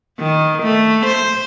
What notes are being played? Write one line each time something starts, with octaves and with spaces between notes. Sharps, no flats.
D#3
A3
C5